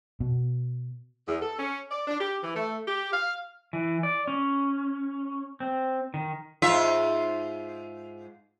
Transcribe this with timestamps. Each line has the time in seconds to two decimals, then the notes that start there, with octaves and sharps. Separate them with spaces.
0.20 B2
1.28 E2
1.41 A4
1.59 C#4
1.91 D5
2.07 D4
2.21 G4
2.43 E3
2.56 A3
2.87 G4
3.12 F5
3.73 E3
4.03 D5
4.27 C#4
5.60 C4
6.14 D#3
6.62 G#2 F4 E5